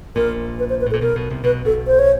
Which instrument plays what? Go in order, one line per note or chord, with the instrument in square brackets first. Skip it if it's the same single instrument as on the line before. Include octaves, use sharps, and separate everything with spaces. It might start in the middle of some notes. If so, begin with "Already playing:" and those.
[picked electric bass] A#1 A#2 [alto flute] A#4
[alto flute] B4
C5
B4
[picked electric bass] A2
[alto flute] A4
[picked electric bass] A#2
[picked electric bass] B1 B2 [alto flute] A#4
[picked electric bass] B1 B2
C2 C3
[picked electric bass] B1 B2 [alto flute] B4
[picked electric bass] B1 B2 [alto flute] A4
[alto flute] C5
C#5